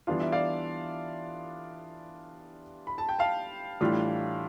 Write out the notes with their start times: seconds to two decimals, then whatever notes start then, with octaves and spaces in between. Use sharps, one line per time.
0.07 E3 G3 B3 D4 F4 F5
0.20 E5
0.32 D5 F5
2.87 B5
2.98 A5
3.09 G5
3.19 F5 A5
3.81 A2 E3 G3 D4 F4